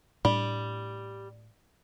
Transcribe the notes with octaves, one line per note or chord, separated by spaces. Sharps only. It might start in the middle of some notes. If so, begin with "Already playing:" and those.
A2 G3 D4